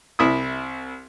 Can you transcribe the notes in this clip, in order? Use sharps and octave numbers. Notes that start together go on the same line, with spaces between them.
C2 E4 D#6